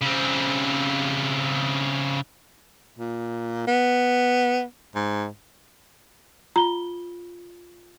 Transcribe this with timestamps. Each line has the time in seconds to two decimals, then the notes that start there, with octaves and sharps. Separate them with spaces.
0.01 C#3 C4
2.99 A#2
3.67 B3
4.95 G#2
6.56 F4 A#5 G7